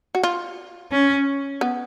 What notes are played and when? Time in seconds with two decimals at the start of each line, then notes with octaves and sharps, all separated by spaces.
0.15 F#4
0.23 F4
0.92 C#4
1.61 B3